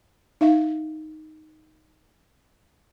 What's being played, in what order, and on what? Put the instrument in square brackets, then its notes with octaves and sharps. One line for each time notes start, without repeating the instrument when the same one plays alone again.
[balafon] D#4 E5 F5